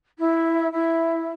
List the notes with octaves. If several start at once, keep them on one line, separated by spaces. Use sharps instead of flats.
E4
E4